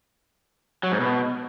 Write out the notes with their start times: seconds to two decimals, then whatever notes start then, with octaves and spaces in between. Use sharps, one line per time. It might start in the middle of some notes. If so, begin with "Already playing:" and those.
0.83 F#3
0.92 G#2
1.00 B2